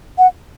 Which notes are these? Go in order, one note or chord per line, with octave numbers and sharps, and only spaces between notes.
F#5